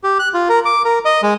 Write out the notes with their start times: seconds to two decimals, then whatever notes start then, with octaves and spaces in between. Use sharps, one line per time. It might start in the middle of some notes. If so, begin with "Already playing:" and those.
0.04 G4
0.19 F#6
0.34 F4
0.49 A#4
0.65 D6
0.85 A#4
1.05 D#5
1.23 G#3